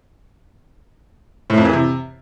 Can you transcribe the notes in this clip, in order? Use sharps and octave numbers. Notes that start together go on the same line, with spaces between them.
A2
F2
E3
C3